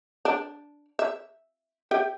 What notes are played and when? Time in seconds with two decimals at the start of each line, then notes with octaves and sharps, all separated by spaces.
0.25 D4
0.99 E5
1.91 G4 E5 G5